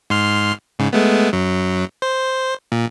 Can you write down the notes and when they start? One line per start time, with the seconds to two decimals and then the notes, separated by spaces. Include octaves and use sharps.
0.10 G#2 C6 F6
0.79 G#2 C#3
0.93 G#3 A3 B3
1.33 F#2 F#3
2.02 C5
2.72 A#2